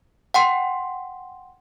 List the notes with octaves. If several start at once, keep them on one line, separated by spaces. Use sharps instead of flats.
F#5 G5 C6